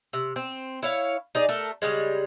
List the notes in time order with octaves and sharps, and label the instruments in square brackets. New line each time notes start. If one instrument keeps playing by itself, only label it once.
[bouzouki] C3
C4
E4 C#5 F5
D#4 G#4 D5
A3 A4 A#4
C#3 G3 G#3